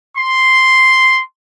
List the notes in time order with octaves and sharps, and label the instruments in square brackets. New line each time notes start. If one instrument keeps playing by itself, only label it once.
[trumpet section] C6